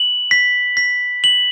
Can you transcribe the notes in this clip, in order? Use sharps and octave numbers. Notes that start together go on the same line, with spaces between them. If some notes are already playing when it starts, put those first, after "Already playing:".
Already playing: F#7
B6
B6
F#7